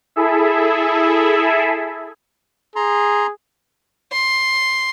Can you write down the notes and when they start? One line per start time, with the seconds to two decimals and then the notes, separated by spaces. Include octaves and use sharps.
0.16 E4 G#4 A4 E5
2.76 G#4 A#5 C6
4.12 C6